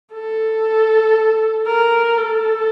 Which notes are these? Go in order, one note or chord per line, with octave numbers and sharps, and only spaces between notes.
A4
A#4
A4